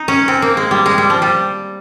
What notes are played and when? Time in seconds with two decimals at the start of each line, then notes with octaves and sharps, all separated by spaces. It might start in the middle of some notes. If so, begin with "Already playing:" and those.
Already playing: D#4
0.08 C#4
0.28 C4
0.42 A#3
0.57 G#3
0.71 G3
0.86 G#3
0.98 G3
1.10 F3
1.22 G3